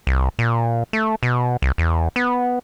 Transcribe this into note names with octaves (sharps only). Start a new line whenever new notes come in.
C2
A#2
A3
B2
C2
E2
B3